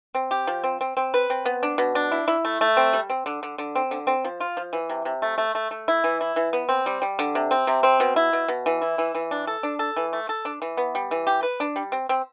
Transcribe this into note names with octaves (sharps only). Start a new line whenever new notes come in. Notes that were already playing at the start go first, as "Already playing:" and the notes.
C4
G4
F3
C4
C4
C4
B4
C4
B3
D4
B2
D4
E4
E4
A3
A3
C4
G3
C4
D3
D3
D3
C4
D3
C4
F3
F4
F3
E3
C3
C3
A3
A3
A3
A3
E4
E3
E4
E3
B3
C4
G3
G3
D3
C3
C4
C3
C4
B2
E4
B2
B2
E3
E4
E3
E3
D4
A4
D4
A4
E3
A3
A4
D4
E3
B3
G3
E3
G4
B4
D4
G3
C4
C4